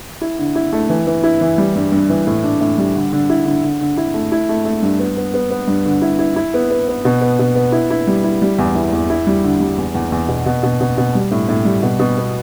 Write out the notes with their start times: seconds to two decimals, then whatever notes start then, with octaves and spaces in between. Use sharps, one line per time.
0.21 E4
0.39 D3
0.55 E4
0.73 A3
0.90 E3
1.07 E3
1.23 E4
1.41 E3
1.58 G3
1.76 G2
1.92 G2
2.09 E3
2.27 A2
2.44 D4
2.61 A2
2.78 G3
2.95 D3
3.13 D3
3.30 E4
3.45 D3
3.63 D3
3.81 D3
3.97 E4
4.14 A3
4.32 E4
4.49 A3
4.65 A3
4.83 G2
4.99 B3
5.17 B3
5.34 B3
5.50 B3
5.68 G2
5.86 D3
6.02 E4
6.19 E4
6.36 E4
6.54 B3
6.70 B3
6.88 B3
7.05 B2
7.21 B3
7.39 B2
7.55 B3
7.72 E4
7.90 E4
8.07 G3
8.24 E4
8.42 G3
8.58 E2
8.75 E3
8.93 E2
9.10 E4
9.27 G3
9.44 D3
9.60 G3
9.78 E2
9.95 E2
10.12 E2
10.29 B2
10.46 B2
10.63 B2
10.81 B2
10.98 B2
11.15 G3
11.31 A2
11.49 A2
11.65 G3
11.83 B2
11.99 B2
12.17 B3